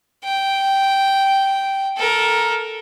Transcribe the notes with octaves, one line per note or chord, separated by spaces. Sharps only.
G5
A4 A#4